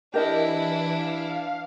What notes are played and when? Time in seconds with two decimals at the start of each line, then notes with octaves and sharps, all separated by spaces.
0.14 E3 D4 E4 G4 A#4 D#5
0.90 F5